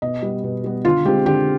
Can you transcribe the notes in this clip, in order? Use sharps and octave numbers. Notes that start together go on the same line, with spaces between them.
B2 D#5
G3 B3
B2
G3 B3
D3 F4
G#3 C4 G4
D3 G4